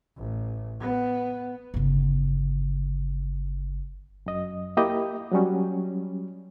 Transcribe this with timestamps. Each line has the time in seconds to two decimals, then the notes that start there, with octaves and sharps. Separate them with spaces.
0.18 A1
0.80 B3
1.74 G1 C#3
4.26 F#2 D#5
4.77 A#3 E4 G4 D#5
5.32 F#3 G3 C#4